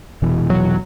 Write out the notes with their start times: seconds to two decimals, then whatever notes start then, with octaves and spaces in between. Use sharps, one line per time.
0.22 F1 B2 E3
0.50 F#3